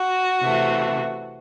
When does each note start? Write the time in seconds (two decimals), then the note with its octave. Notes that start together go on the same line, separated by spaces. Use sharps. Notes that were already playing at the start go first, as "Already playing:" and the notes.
Already playing: F#4
0.42 C3 E3 A3